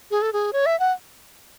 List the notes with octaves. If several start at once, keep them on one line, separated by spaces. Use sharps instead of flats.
G#4
A4
G#4
C#5
E5
F#5